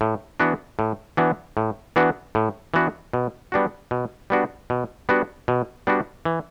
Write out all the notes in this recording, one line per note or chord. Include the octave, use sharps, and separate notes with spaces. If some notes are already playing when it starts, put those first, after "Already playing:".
A2
E3 B3 D4 F#4
A2
E3 B3 D4 F#4
A2
E3 B3 D4 F#4
A2
E3 B3 D4 F#4
B2
G3 B3 D4 F#4
B2
G3 B3 D4 F#4
B2
G3 B3 D4 F#4
B2
G3 B3 D4 F#4
E3